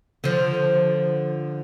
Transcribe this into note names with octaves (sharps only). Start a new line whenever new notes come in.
D3 F3